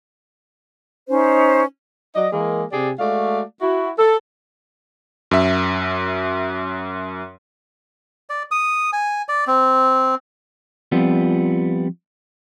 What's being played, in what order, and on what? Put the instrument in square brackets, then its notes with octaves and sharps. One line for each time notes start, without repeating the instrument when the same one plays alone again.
[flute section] C#4 D#4 C5
[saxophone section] F#3 D5 D#5
E3 G#3 A#3 G#4 A#4
C3 G4 G#4 D5
G#3 A3 F#4 D5 F5
E4 F#4
A4
[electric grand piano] F#2 E5
[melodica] D5
D#6
G#5
D5
C4
[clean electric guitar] F3 G3 B3 C4 F4